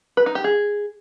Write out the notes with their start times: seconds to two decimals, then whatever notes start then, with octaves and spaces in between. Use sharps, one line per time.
0.17 B4
0.26 D#4
0.35 G4
0.44 G#4